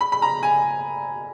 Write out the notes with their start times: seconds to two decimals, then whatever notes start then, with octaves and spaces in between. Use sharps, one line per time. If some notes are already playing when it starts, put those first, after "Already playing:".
0.01 B5
0.12 B5
0.22 A#5
0.43 G#5